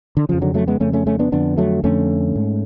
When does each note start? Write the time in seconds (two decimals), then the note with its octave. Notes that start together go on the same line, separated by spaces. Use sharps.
0.17 D3
0.29 F2 C#3 F3
0.42 D3 F#3
0.54 F#3 A3
0.68 G#3 B3
0.80 F2 C#3 A3 C#4
0.93 A3 C#4
1.07 A3 C#4
1.19 B3 D4
1.32 F2 D3 B3 D4
1.57 F#3 A3
1.84 F2 D3 A3 C#4
2.36 G#2